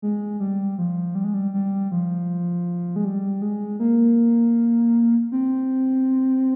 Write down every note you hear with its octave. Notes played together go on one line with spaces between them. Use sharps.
G#3
G3
F3
G3
G#3
G3
G3
F3
G#3
G3
G#3
A#3
C4